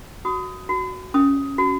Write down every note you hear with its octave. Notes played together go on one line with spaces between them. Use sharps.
F#4 D#6
F#4
C#4 D#6
F#4